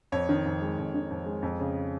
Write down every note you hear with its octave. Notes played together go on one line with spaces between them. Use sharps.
F2 C#5
D#3
F2
G#3
F2
D#3
F2
G#3
F2
C#3